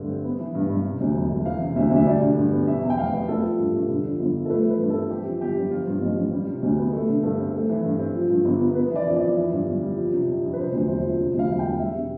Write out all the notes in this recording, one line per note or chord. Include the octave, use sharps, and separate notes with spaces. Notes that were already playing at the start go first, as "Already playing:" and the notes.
Already playing: G2 D3 A3
C4
B3
E3
G2
G2
C3
D2
E1
E1
E3 F5
C3
D2 E5
D2 E5
G3 D5
D3
G2
B3
B2 E5
E2
G5
F1 F5
B3
A3 A4
F3
G2
G2
D3
F2
G1
F3
A4
A3 B4
E3 B4
G2
A4
C4
E3 G4
F2
G1 G4
G1
F3 F4
G2
A1
A1
G3
C3
D2
B3
A3
D3
G2 A4
C4
A3
E3
G2
C4
F3
G2
G1
B3
B3 B4
E3 D5
F2
D5
F2
E3
G2
G1
G3
F3
C3
F2
F2
B4
C3 C5
D2
E1 C5
F3
C3
D2
F5
E1 F5
G5
E1
G3 E5
B2